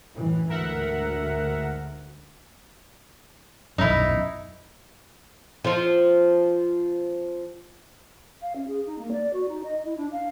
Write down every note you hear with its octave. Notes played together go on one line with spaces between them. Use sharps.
F#2 A2 E3
D2 G#2 A#4 E5 F#5
D#1 B1 F#2 D#4 E4
F3 C4 F4
F5
C#4
G#4
D#4
A#3
D5
F#4
D#4
D#5
E4
D4
F5